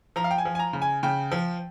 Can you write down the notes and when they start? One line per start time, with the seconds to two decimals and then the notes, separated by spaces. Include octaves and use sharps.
0.16 F3 A#5
0.24 F5
0.31 G5
0.38 G#5
0.45 F3
0.55 G#5
0.59 A#5
0.73 C#3
0.82 G#5
1.03 C#3 G5
1.32 F3